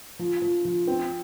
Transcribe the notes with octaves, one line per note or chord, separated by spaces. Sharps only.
F3
F3
F3
C4